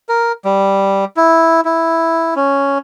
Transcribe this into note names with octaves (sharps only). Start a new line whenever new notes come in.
A#4
G3
E4
E4
C#4